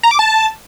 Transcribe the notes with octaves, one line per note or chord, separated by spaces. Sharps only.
A#5
D6
A5